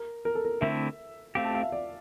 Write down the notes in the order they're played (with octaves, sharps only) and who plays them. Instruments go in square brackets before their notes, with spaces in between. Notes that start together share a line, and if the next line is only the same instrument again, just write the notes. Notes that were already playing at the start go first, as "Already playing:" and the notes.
Already playing: [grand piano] A#4
A#4
A4
A#4
[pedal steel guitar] D3 A3 C4 E4 [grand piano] E5
[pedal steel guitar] A3 C4 G4 [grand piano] F5
[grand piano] A5
F5
E5
D5